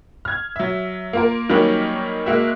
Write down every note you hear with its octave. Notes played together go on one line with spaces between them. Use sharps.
F6 G#6
F#3 E5
A#3 F4 A#4
D#3 F#3 G3 A#3 C#4
G#3 A#3 F#4 E5